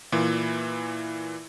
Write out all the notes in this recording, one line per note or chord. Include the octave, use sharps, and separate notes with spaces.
A#2 E3